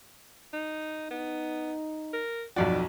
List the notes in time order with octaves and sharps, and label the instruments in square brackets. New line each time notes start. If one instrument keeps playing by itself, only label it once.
[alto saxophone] D#4
[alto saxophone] B3 [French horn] D#4
[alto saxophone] A#4
[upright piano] B1 F2 F#4 [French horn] D#4 [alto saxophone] D5